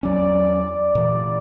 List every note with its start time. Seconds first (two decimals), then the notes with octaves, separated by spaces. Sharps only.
0.03 E2 F#3 C#4 D5
0.95 A#2 E3